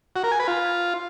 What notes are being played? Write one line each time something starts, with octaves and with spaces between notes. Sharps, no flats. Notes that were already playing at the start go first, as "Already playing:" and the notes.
F#4
A#4
G#5
B4
F4